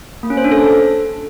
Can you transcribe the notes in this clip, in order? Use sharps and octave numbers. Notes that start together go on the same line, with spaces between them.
A#3
C#4
C5
D4
A4